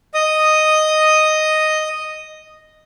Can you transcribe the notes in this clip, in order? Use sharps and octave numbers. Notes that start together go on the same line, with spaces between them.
D#5 D#6